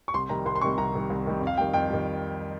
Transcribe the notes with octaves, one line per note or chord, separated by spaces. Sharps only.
C#6
C2 C6
C3 D#3 G3 A#5
C2 C6
C6
C3 D#3 G3 C#6
C2 A#5
C3 D#3 G3
C2
C3 D#3 G3
F2
F5
D#3 G3 G5
F2 G5
D#3 G3